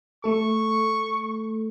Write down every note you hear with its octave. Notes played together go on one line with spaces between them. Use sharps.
A3 A4 C#6